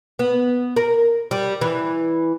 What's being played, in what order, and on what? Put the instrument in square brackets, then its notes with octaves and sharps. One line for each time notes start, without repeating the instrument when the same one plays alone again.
[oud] B3
A#4
G3
E3